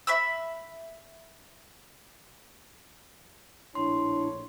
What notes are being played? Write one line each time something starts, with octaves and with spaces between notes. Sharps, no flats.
E5 B5 E6
A#1 A2 D4 E4 C#5 C6